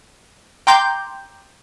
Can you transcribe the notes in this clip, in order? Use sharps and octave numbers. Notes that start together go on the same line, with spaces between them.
G5 A#5 C6 D6 G6